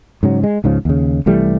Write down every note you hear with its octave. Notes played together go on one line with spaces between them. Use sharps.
G#2 C#3 F#3
G#3
C#2 G#2 C#3 F3
D#2 C#3
C2 E3 G3 A3